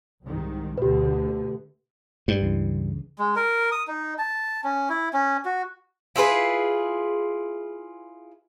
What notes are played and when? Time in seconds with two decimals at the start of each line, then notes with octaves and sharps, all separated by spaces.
0.24 C2 G#2 D#3
0.78 D2 B2 D3 G4 B4
2.28 G2
2.41 C#2 C#3 E3
3.19 G#3
3.36 A#4
3.72 D#6
3.87 D#4
4.18 A5
4.64 C#4
4.89 E4
5.13 C#4
5.45 F#4
6.16 E4 F4 G#4 B4